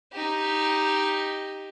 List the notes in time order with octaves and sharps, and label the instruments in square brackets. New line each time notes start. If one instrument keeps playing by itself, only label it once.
[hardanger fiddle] D#4 G4